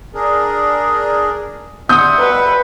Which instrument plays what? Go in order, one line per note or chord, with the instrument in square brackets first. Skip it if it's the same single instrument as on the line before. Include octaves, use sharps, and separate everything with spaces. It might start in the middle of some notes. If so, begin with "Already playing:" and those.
[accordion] D4 G#4 A#4
[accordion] G3 E5 F#5 [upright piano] C6 D#6 G6
[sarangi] B4